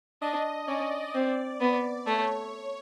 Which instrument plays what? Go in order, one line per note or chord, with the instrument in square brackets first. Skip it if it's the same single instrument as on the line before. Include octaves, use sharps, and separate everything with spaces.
[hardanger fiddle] D4 [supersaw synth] D#5
[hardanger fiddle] C#4 [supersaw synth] D5
[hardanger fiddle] C4
B3
[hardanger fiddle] A3 [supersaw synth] C#5